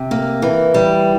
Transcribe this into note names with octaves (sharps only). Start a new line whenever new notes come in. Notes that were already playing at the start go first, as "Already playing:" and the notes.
Already playing: C3
A#3
E3
G3